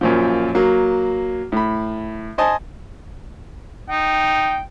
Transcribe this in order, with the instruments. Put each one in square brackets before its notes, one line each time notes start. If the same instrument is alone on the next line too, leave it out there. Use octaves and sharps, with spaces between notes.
[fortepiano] F#2 A#2 F3
F#3 A#3
A2 B5
C5 D#5 G#5 A5
[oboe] D#4 [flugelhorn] G5